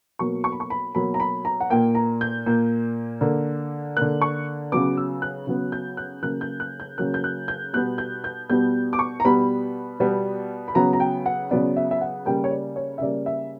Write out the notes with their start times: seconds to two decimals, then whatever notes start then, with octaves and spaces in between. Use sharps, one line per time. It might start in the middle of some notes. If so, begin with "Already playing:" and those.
0.19 B2 F#3 A#3 C#6
0.44 C#6
0.52 B5
0.60 C#6
0.70 B5
0.95 B2 F#3 A#3 B5
1.14 A#5
1.20 B5
1.45 A#5
1.60 F#5
1.70 A#2 A#3 G5
1.95 A#5
2.21 G6
2.46 A#2 A#3
3.21 D3 A#3
3.97 D3 A#3 F#6
4.22 C#6
4.72 C#3 F#3 B3 D6
4.97 E6
5.22 F#6
5.47 C#3 F#3 B3
5.72 G6
5.97 F#6
6.22 C#3 F#3 A#3 F#6
6.41 G6
6.60 F#6
6.80 G6
6.98 C#3 F#3 A#3 F#6
7.14 G6
7.24 F#6
7.48 G6
7.73 B2 G3 B3 F#6
7.98 G6
8.24 G6
8.49 B2 G3 B3 G6
8.93 D6
8.99 C#6
9.20 A#5
9.25 B2 G3 B3 B5
10.00 B2 G3 B3
10.68 B5
10.75 C#3 F#3 B3 A#5
10.93 A#5
11.00 G5
11.26 F#5
11.51 C#3 F#3 B3 D5
11.76 E5
11.91 E5
12.01 F#5
12.26 C#3 G3 A#3 G5
12.44 C#5
12.51 D5
12.76 C#5
12.98 E5
13.01 C#3 G3 A#3 D5
13.26 E5